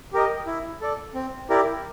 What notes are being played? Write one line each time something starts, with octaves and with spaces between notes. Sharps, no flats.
G4 A#4 D#5
E4
A4 D5
C4
E4 G4 A#4 D5